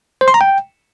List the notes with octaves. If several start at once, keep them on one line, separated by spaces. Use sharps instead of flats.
C5
C6
A#5
G5